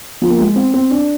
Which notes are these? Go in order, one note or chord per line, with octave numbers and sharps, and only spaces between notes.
F3
A#3
G#3
C4
C4
D4